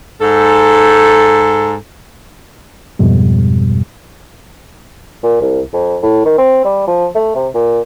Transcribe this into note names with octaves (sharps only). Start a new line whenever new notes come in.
G#2 A4
F2 G#2 B2 G3
A#2
C2
F2
A2
D#3
C4
G3
F3
A3
C3
A#2